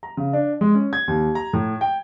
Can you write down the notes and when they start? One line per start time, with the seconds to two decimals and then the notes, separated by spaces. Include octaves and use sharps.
0.03 A#5
0.17 C#3
0.33 D4
0.61 G#3
0.74 C#4
0.93 G#6
1.08 D#2
1.35 A#5
1.53 A2
1.81 G5